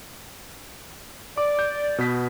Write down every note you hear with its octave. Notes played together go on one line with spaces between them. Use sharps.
D5 D6
G6
B2 B3 B6